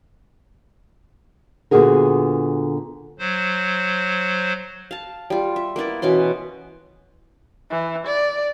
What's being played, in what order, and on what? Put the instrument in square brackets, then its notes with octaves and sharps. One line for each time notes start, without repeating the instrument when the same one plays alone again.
[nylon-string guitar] A#2 D3 B3 F#4 G#4 A#4
[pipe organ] F#3 C5
[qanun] F5 A5
G3 F4
E5
A#3 B3 E4 D5
B2 E3 C#4 C6
[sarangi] E3
D5